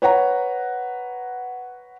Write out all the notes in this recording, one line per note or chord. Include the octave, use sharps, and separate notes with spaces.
B4 C#5 F#5 A#5